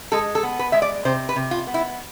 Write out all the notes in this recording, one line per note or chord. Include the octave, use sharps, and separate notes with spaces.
G#3 A4
A4
B3
B4
G#3 E5
D5
C3 C5
B4
C3
F4
B3
E4